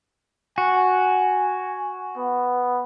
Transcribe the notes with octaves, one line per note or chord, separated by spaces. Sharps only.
F#4 G#5
B3